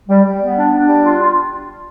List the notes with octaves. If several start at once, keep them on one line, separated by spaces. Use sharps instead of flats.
G3
G3
B3
D4
D4
G3
F4
F4